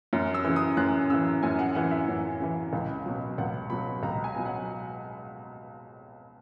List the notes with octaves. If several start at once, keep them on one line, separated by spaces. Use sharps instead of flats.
F#2
E6
C#3 E3
D#6
F#2 F#6
C#3 E3 E6
F#2 G#5
F#5
C#3 E3 F#5
E5
F#2
C#3 E3
C#2
B2 F#3
C#2 F#5
B2 F#3 B5
C#2 A#5
G#5
B2 F#3
F#5